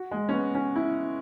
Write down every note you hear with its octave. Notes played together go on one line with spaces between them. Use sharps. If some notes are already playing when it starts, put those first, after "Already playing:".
Already playing: F#4
G#3
C#4
B3
C#4
E4